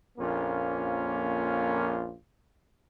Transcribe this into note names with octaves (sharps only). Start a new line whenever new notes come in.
A#1 F2 A#3 C#4 F4